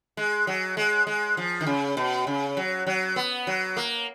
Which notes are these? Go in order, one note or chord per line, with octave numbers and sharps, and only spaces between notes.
G#3
F#3
G#3
G#3
F3
D#3
C#3
B2
C#3
F#3
F#3
B3
F#3
A#3